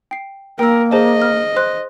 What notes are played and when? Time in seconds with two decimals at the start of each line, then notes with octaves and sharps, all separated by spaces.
0.11 G5 C7
0.59 A#3 A#4 G5 E6
0.92 G#4 C5 D#5 A5
1.22 F6
1.56 C5 C6 F#6